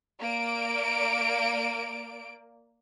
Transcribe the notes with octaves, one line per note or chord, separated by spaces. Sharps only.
A#3 D5 D7